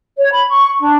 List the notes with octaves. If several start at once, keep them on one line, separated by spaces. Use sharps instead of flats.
C#5
B5
C#6
D4